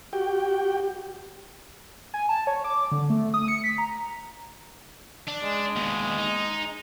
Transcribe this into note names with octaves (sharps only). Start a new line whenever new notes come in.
F#4 G4 G5
G#5
A5
C#5
D6
D3
A3
D#6
C#7
B6
A#5
D4
G#3
D#2 B2
D#4